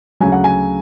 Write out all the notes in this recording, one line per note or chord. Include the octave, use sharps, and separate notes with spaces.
D2 C#3 F#3 G#5
F#5
G#5